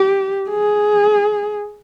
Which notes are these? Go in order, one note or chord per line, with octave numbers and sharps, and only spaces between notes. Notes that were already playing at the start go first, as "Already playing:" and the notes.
Already playing: G4
G#4